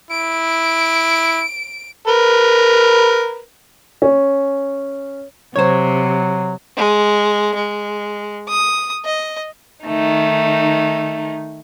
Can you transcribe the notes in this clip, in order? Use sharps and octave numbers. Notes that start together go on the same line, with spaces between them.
E4 D7
A#4 B4
C#4
C3 F#3 C5 C#5
G#3
G#3
D#6
D#5
D#3 A3 D#4